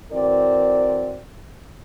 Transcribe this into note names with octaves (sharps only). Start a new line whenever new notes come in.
E3 C4 F#4 A#4 D5